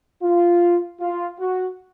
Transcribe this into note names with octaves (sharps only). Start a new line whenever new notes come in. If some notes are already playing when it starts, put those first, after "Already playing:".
F4
F4
F#4